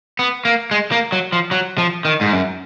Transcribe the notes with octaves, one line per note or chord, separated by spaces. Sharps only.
B3
A#3
G#3
A#3
F#3
F3
F#3
F3
D#3
G#2
F#2